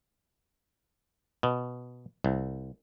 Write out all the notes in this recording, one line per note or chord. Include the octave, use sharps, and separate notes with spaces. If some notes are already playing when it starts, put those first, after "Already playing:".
B2
C2